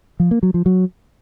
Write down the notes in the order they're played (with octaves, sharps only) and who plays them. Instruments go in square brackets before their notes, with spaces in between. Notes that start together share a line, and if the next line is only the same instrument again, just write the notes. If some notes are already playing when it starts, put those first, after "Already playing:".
[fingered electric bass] F3
A#3
F#3
F3
F#3